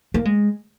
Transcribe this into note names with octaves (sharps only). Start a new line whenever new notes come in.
A#3
G#3